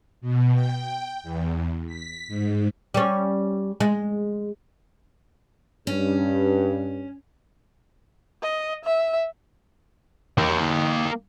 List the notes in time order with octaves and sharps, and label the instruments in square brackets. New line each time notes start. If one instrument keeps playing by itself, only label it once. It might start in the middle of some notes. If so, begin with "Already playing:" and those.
[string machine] B2
G5
E2
B6
G#2
[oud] G3 C#4
G#3
[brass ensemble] G2 [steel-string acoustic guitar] C#4
[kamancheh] D#5
E5
[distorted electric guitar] A#3 G5